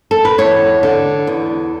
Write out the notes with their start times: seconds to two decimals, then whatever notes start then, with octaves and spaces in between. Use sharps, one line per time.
0.11 A4
0.25 B4
0.38 E2 C#5
0.83 D3
1.27 E2